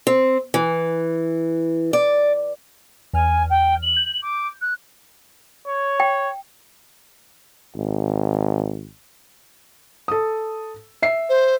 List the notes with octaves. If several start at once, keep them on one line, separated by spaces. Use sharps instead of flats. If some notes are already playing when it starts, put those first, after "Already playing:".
C4
E3
D5
E2 G#5 F6
G5
F#7
G6
D6
F#6
C#5
G5
G#1
A4 D#6
E5 C7
C5